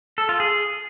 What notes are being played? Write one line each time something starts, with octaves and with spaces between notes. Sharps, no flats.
A4
F4
G#4